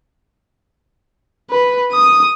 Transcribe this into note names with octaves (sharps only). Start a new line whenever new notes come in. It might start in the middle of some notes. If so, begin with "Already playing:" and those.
B4
D#6